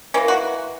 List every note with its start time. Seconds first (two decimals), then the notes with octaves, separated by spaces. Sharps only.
0.14 E3 A#3 C#4
0.28 F#4